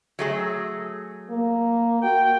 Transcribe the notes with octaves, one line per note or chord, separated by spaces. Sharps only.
F#3 A3 G#4
A#3
F#4 G5